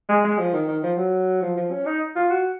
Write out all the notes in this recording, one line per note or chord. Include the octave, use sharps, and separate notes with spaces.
G#3
G#3
F3
D#3
D#3
F3
F#3
F3
F3
C#4
D#4
F4
F#4